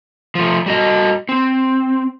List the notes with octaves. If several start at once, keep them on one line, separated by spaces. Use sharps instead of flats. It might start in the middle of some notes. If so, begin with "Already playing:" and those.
F3 A3
G3 F#4 D#5
C4